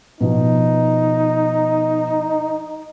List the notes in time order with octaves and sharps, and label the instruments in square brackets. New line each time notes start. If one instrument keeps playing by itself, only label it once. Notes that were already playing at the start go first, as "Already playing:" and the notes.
[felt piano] B2 F3 [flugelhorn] D#4